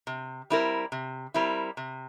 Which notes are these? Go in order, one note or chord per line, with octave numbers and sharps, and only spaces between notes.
C3
G3 C4 E4 A#4
C3
G3 C4 E4 A#4
C3